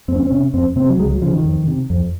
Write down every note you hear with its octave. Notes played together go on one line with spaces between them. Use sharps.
F2 C4
C#4
C4
C3 C#4
F2 C4
C3 C4
F#3
C#2 G#3
F#3
C#3 F3
D#3
F2
C3
F2